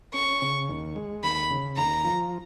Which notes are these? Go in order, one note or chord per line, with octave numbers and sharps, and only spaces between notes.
C#4 C#6
C#3
D#2
G#3
D#2 B5
C#3
D#2 A#5
F3